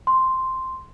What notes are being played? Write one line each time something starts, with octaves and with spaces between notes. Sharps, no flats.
C6